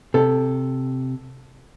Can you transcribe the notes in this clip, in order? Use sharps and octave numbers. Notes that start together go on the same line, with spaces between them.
C3 A4